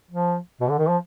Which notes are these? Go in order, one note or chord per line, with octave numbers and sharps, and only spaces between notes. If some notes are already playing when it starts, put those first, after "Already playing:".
F3
B2
D3
D#3
F3